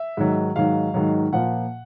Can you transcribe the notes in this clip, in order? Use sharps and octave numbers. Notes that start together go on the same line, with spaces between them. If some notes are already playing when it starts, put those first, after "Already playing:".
Already playing: E5
G#2 D#3 F#3
G#2 D#3 F#3 F5
G#2 D#3 F#3
A#2 F3 A#3 F#5